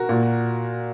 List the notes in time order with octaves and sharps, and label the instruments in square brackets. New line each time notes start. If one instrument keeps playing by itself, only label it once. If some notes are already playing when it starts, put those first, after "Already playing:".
Already playing: [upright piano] F#4 A#4
A#2